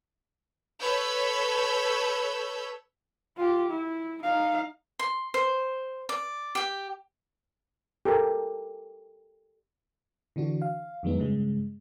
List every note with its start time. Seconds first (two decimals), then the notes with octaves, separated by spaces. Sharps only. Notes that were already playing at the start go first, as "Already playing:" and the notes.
0.81 A4 B4 C#5 B5 E6 G6
3.37 F4 G4
3.70 E4
4.22 D#4 F5
4.99 C6
5.34 C5
6.09 D5
6.55 G4 G5
8.05 G4 A4 A#4
10.36 D3 E3 D4 F#4
10.62 F5
11.03 F2 D#3 F#3 G#3 B3 D#4
11.19 G2 C#3 G#3